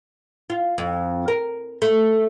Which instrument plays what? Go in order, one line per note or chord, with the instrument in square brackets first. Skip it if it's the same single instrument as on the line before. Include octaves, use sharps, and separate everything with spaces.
[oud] F4
F2
A#4
A3